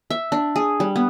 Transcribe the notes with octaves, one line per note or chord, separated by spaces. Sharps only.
E5
D4
G#4
G3
B3